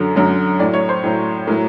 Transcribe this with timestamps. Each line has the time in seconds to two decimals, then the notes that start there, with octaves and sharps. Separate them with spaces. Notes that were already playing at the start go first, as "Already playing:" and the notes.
Already playing: F#2 D3 F#3
0.15 F#2 D3 F#3
0.59 A2 D5
0.63 F#3
0.74 C#5
0.89 C5
1.04 A2 F#3
1.47 A2 F#3 A#4